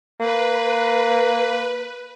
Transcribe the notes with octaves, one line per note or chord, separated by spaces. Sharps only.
A#3 B4